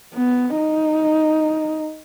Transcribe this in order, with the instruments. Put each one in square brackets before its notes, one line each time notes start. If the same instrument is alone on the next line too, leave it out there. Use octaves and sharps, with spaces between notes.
[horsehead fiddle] B3
D#4